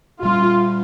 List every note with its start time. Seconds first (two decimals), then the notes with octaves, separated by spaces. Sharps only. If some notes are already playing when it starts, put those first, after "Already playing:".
0.23 A#2 G3 C#4 F4